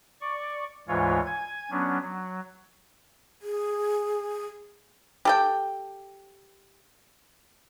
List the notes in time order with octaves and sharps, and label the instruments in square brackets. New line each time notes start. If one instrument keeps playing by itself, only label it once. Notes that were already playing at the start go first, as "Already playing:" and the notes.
[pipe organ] D5 C#6
D2 G#2 E3 G#3 F4 C#5
G#5 G#6
F#3 B3 C#4 D4
F#3
[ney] G#4
[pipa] G4 A4 G5